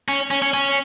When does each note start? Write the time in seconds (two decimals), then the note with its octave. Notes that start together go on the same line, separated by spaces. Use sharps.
0.08 C#4
0.31 C#4
0.42 C#4
0.54 C#4